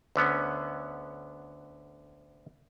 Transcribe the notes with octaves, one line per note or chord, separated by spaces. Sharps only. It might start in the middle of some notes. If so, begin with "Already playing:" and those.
D2 D3 B3 C#4